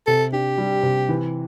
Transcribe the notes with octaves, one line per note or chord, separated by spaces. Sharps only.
C3 A4
D4 G4
G3
C3
E3